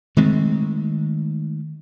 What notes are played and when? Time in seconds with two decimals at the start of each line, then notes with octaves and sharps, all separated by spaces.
0.17 D#3 G#3 A3 C4